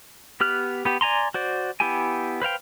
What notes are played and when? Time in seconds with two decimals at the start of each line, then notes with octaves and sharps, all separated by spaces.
0.40 B3 G4 F6 F#6
0.85 B3 G4
1.01 D5 G#5 A#5 C6
1.34 F#4 C5 D5
1.80 B3 E4 G4 G5 G#5
2.42 B4 C5 F5 G5